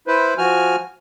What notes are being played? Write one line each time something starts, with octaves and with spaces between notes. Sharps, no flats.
E4 B4 C5
F3 F#4 G#5 F6